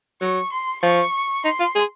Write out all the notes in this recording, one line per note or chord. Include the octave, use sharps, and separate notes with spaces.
F#3 C#6
C6
F3 C#6
D#4 C6
F4
G#4